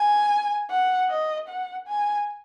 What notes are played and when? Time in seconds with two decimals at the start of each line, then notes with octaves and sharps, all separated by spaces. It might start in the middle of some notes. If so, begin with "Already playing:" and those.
Already playing: G#5
0.70 F#5
1.10 D#5
1.49 F#5
1.88 G#5